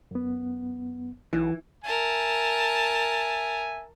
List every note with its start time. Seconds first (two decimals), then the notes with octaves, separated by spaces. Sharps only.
0.11 F#2 B3
1.33 B1 E3
1.84 A#4 E5 G#5 A5